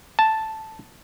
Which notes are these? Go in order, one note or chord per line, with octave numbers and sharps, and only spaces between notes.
A5